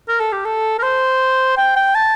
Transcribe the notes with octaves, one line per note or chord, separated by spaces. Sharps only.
A#4
A4
G4
A4
A#4
C5
G5
G5
A5